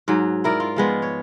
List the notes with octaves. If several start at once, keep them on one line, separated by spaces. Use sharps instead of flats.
G#2 F#3
E4 A#4 D5
F4
F3 G#3 B3
C#5